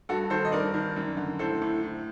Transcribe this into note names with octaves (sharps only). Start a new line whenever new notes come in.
G2 F#4 A4
D#3 A4 C5
D#5
G2 A#4 D5
D#3
F#2
D3
A2 A4 C5
A2
A2